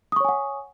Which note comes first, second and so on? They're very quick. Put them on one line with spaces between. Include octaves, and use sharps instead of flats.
D#6 C#6 C#5 G#5 F#5